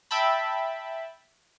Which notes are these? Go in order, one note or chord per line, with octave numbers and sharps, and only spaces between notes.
E5 G5 A5 B5